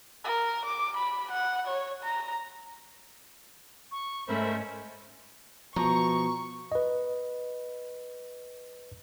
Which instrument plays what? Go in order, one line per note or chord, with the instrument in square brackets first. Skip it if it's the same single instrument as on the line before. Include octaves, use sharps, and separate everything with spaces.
[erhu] A#4
D6
B5
F#5
C#5
A#5
[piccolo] C#6
[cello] G#2 C#4 [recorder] A3 [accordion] A#4 C5 E5 [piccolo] B5
[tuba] B2 [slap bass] F3 [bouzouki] A#5 [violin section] C#6
[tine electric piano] B4 D#5